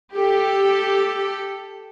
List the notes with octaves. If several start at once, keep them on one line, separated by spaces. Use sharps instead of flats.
G4 A4